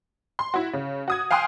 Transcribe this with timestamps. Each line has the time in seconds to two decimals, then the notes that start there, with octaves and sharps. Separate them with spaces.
0.39 C6
0.54 E4 F#4
0.73 C#3
1.08 F#4 D#6 G#6
1.31 F5 G5 G#5 C6 D#6 F#6